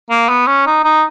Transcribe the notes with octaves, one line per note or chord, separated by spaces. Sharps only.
A#3
B3
C#4
D#4
D#4